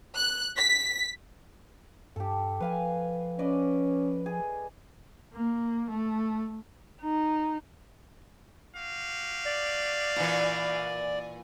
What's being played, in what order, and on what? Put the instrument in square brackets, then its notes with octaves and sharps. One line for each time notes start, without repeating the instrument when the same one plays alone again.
[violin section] F#6
B6
[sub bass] G2 [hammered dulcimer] G4 A4
[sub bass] F3 [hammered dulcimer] B4 F5 G#5
[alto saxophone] C#4 [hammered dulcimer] B4 D5 D#5
[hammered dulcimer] G#4
[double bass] A#3
A3
[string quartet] D#4
[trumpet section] F#4 G4 F5
[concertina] D5
[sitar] A#2 E3